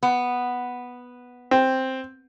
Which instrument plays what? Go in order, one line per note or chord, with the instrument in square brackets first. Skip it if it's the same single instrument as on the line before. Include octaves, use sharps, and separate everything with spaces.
[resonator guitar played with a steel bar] B3
[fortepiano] C4